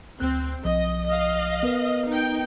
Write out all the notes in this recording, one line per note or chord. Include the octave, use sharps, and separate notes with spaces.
D2 C4 F#6
B1 F3 D#5
D#5 F5
B3 A#4 B4
D#4 G5